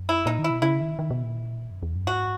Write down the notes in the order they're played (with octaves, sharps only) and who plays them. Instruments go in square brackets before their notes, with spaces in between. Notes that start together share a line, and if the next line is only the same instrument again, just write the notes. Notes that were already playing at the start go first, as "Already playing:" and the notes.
Already playing: [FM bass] F#2
[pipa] E4
[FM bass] A#2 [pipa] D#4
[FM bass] D#3
[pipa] E4
[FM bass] B2
[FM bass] C#3 [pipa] E4
[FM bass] D#3
D#3
B2
A#2
F#2
E2
F#2
[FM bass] G#2 [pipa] F#4